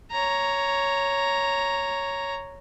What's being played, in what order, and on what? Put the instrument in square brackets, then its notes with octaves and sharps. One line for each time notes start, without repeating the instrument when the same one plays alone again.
[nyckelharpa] C#5 A#5